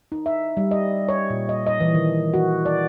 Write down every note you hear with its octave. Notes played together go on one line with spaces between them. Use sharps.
D#4
E5
G3
D#5
C#5
A#2
D#5
D#5
E3
D#3
F#4
D5